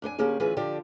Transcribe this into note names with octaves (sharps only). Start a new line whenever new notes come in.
F2 D4 A4 G#5
D3 A#3 C#4 G4 G#4
D2 E3 C#4 F4 G#4 B4
D3 F3 G4 D5